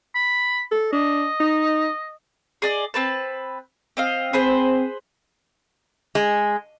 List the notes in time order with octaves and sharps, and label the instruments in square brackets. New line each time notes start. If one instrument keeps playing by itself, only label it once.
[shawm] B5
[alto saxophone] A4
[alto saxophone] D4 [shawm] D#5
[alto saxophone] D#4
[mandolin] G#4 D5 D#5
C4 B4 A5
C4 D#5 F5
[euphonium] C4 [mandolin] G#4 B4 C5
[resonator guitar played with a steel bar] G#3